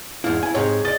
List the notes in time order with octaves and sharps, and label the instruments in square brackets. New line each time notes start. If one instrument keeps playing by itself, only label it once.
[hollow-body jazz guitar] E2 G#2 E4 [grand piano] F5
[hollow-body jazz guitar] E4 G#5
[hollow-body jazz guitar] G#2 C3 [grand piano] G#4 C#5
[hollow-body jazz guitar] D5 D#5 [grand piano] A6